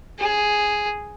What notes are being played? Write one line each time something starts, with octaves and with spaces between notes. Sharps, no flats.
G#4